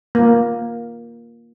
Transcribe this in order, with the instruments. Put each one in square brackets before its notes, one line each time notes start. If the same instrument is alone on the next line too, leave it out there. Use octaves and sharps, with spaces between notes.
[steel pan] A#3